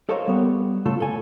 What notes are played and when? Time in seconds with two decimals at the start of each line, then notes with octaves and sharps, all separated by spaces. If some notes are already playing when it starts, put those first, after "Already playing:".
0.09 A4 A#4 C5 C#5 D#5 F5
0.28 G3 B3
0.86 C#3 A3 F4 A4
1.00 A4 G#5